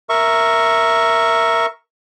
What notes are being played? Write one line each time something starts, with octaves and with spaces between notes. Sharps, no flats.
A#4 E5 C#6